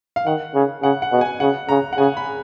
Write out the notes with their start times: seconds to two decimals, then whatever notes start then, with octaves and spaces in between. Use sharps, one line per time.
0.16 F5
0.26 D#3 F#5
0.55 C#3
0.83 C#3 F#5
1.02 F#5
1.12 B2
1.21 G#5
1.40 C#3 F#5
1.69 C#3 A#5
1.93 F#5
1.98 C#3 G#5
2.17 B5